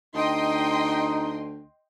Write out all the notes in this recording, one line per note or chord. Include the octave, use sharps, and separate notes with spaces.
D2 D#4 D#5 G5 C6